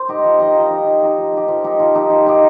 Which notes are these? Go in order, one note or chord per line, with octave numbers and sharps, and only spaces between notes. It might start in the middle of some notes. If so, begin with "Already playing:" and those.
Already playing: C5
D#4 G4 D#5
F3
D#4 G4 D#5
F3
D#4 G4 D#5
F3
D#4 G4 D#5
F3
D#4 G4
F3
D#4 G4
F3
D#4 G4
F3
D#4 G4